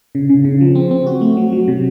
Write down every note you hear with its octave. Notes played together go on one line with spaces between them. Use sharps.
C#3
C#3
C#3
F3
C4
C4
F#4
A3
F#3
F#3
C3